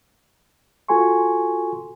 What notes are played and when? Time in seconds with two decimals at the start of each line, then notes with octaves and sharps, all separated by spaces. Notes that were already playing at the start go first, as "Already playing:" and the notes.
0.89 F4 F#4 A4 G#5 C6 C#6